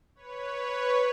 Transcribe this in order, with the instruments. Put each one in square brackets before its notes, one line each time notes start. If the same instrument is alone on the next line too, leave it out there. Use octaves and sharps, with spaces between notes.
[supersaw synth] B4 C#5